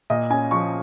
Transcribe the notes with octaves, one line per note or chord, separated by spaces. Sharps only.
A#2 D#5
C#4 G#5
F3 C#6